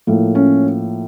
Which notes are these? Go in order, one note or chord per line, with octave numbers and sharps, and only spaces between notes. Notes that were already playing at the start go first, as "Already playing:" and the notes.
A2 F3 A#3
C#4